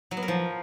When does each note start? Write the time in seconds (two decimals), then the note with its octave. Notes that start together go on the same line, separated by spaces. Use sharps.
0.11 F#3
0.17 B3
0.22 A#4
0.28 F3